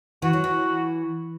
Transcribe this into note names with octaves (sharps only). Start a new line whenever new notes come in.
E3 F#4
F#3
E3